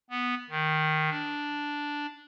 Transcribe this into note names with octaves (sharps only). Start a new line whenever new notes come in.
B3
D#3
D4